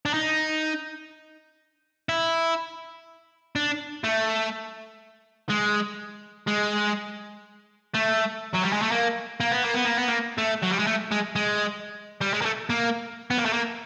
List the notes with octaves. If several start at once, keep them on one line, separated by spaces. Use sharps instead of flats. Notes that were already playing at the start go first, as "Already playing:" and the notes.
D4
D#4
E4
D4
A3
G#3
G#3
A3
F#3
G3
G#3
A3
A#3
A#3
B3
A#3
B3
A#3
B3
A#3
A3
F#3
G3
G#3
A3
G#3
G#3
G3
G#3
A#3
A3
A#3
B3
A#3
A3
A#3